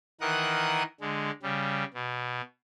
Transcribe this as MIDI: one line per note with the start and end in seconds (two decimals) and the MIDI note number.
0.21 0.83 51
0.21 0.83 52
0.21 0.83 70
0.21 0.83 78
0.21 0.83 87
0.21 0.83 90
1.01 1.31 50
1.01 1.31 56
1.42 1.84 49
1.42 1.84 55
1.94 2.41 47